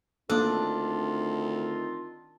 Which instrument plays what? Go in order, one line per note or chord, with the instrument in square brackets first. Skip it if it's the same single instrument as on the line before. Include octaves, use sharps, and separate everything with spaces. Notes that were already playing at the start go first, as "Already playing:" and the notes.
[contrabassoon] D2 [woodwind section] D#3 C4 F4 [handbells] A#3 A4 [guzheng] D4